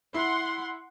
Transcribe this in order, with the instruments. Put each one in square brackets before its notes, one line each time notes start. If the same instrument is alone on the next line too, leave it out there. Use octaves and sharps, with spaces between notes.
[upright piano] E4 [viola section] F#5 C6